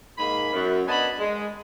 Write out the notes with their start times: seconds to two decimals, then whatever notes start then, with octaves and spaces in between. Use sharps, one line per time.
0.18 G#2 A#3 G#4 B5
0.53 F#2
0.88 B3 D4 D#5 G#5 A5 B5
1.19 G#3